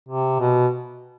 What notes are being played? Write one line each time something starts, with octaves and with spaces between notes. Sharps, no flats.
C3
B2